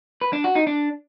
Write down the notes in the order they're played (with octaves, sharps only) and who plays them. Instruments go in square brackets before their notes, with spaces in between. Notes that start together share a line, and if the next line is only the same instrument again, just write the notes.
[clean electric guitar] B4
D4
F#4
D#4
D4